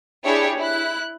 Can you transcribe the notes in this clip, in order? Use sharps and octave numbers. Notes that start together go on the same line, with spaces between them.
D4 E4 G4 G#4 C#5
E4 F#6